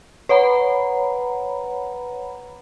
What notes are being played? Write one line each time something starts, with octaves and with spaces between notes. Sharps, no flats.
B4 C#5 F#5 A#5 B5